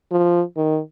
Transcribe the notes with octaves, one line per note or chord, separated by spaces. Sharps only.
F3
D#3